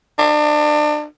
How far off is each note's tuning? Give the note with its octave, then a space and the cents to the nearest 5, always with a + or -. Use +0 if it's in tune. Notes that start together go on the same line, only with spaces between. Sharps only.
D4 +30